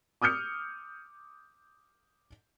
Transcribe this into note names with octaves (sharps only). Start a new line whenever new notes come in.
D6 D#6 F6 G6 C#7